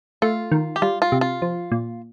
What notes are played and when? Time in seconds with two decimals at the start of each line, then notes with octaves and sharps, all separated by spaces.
0.22 A3 F4
0.52 D#3
0.76 G4
0.82 G3 F4
1.02 F4
1.12 C3
1.21 F4
1.42 F3
1.72 A#2